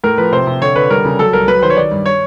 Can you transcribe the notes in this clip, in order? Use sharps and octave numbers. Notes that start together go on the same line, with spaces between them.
A2 A#4
F3 B4
C3 C5
C3
D3 C#5
D3 B4
G3 A#4
C#3
F#3 A4
C2 A#4
F#3 B4
D#3 C5
C#5
D#3 D5
G2
C#5